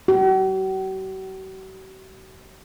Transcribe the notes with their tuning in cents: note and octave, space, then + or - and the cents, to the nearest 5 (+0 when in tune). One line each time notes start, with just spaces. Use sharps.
F#4 +45